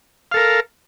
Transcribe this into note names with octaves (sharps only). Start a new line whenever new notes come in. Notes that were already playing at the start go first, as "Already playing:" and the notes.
A4 A#4 F5